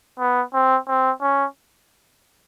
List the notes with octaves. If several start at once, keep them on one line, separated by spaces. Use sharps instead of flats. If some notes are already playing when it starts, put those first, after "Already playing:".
B3
C4
C4
C#4